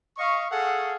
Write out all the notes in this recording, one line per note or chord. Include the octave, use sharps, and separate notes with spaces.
D#5 F5 C#6
G#4 A4 F5 F#5